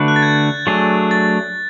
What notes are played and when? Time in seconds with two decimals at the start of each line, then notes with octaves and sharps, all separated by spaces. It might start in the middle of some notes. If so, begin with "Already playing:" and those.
Already playing: D3 A3 D4 F#4 B4
0.08 F#6
0.16 A6
0.22 G#6
0.67 F#3 A3 D4 G#4
1.11 A6